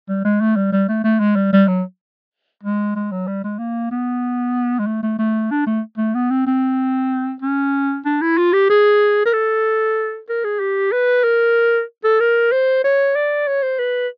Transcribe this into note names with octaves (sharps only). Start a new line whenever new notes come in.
G3
G#3
A3
G3
G3
A3
A3
G#3
G3
G3
F#3
G#3
G#3
F#3
G3
G#3
A#3
B3
G#3
A3
A3
A3
D4
A3
A3
B3
C4
C4
C#4
D4
E4
F4
G4
G#4
A#4
A4
A#4
G#4
G4
B4
A#4
A4
A#4
C5
C#5
D5
C#5
C5
B4